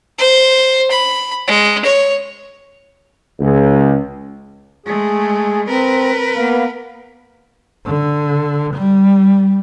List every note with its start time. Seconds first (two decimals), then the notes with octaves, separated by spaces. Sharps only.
0.18 C5
0.90 B5
1.47 G#3
1.85 C#5
3.40 C#2
4.86 G#3 A3 G#4
5.68 C4 A#4 B4
6.36 A#3 B3 F5
7.86 D3
8.75 G3